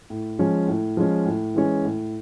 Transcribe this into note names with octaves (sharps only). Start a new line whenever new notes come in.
A2
F3 G#3 C#4
A2
F3 G#3 C#4
A2
E3 G#3 C#4
A2